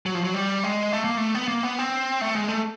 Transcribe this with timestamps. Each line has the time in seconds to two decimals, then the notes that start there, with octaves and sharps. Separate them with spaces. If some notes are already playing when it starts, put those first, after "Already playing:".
0.06 F#3
0.15 F3
0.24 F#3
0.34 G3
0.63 G#3
0.92 A3
1.04 A#3
1.17 A3
1.35 B3
1.48 A#3
1.63 B3
1.79 C4
2.21 A3
2.35 G#3
2.48 A3